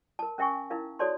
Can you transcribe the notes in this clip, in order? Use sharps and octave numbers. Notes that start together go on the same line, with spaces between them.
A#4 A5
C#4 A#4 E5 G5 G#5 C#6
D#4 E4 A#4 F5
F#4 A4 C#5 D5 A5 C6